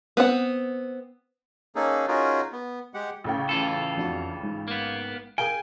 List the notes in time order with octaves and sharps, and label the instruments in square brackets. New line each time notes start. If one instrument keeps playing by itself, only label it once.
[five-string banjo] B3 C4 F#5
[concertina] A#3 C#4 D#4 G#4 A4
C#4 D#4 F4 F#4 G#4 A#4
B3
G#3 G4 F#5
[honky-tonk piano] A1 C#3 G5
[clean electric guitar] E3 F4 A4
[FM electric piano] F2 D4 F#4
G#2
[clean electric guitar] A#3 B3
[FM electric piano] G#4 A#4 F5 [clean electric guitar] G5 [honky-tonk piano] G#5